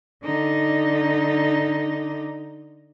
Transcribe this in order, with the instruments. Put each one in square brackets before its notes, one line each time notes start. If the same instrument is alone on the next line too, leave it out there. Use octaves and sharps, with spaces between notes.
[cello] D3 D#4